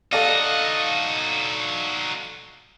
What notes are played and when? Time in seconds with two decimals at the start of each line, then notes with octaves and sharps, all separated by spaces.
0.13 D#4 F#4 A4 D5 D#5 F5